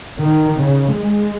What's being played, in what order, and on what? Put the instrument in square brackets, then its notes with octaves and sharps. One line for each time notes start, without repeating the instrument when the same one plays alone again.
[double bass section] D#3
C#3
G#3